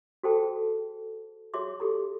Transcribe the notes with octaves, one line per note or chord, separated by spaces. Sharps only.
F#4 G#4 A4 C5 G5 A5
F#4 G#4 C#5 E5 C6 D6
G4 A4 A#5